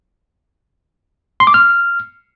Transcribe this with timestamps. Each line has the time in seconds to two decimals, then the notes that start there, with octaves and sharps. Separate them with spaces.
1.40 C6
1.47 D6
1.54 F6